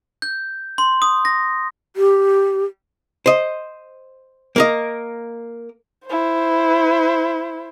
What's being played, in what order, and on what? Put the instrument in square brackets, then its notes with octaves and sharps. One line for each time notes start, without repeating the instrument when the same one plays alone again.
[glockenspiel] G6
C6
D#6
A#6
[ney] G4
[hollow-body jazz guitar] C5 D#5
A#3 A#4 D#5
[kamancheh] E4 C5